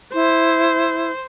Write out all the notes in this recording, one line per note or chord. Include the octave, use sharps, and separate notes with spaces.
E4 C5